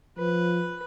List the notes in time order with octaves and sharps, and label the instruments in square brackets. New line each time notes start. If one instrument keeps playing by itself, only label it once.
[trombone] F3 [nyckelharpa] B4